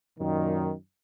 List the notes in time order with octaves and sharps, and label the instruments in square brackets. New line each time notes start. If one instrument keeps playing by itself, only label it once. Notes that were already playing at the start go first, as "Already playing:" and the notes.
[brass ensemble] F#2 A#2 D#3